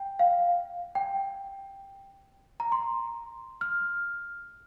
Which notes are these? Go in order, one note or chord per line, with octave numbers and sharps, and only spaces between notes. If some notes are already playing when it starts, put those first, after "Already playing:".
Already playing: G5
F5
G5
A#5
C6
F6